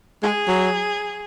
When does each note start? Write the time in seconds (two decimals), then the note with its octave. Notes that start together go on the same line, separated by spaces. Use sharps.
0.23 G#3 G#4
0.48 F#3